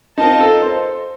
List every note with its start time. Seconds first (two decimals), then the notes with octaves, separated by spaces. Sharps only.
0.18 C4 D#4 F4 A#4 D#5 A5
0.40 A4
0.62 C5